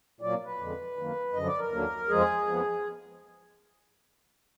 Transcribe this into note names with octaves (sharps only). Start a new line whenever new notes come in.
A#2 F#3 A#3 D5
B4
F2 D3 G#3
F#2 D#3 A#3
F#2 D3 F3 D#5
D5
A#4
D#2 D3 F#3 A#3
F2 F3 G#3 G#4
F2 F3 B3